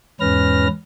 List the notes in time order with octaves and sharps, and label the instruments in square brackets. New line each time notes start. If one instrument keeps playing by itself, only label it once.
[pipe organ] E2 G#2 C#4 B4 F6 A#6